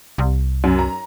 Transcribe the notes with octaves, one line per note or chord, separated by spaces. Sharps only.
C2
F#2
A#5